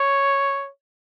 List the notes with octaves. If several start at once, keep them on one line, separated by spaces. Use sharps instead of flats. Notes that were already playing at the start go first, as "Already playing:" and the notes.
Already playing: C#5